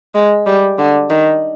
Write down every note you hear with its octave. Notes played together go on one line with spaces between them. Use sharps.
G#3
G3
D3
D#3